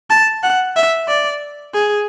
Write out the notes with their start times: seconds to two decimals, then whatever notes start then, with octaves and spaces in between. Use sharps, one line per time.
0.10 A5
0.43 F#5
0.76 E5
1.08 D5
1.74 G#4